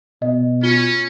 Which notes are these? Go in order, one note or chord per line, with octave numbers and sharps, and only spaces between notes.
B2 D#5
C#4 F4 G7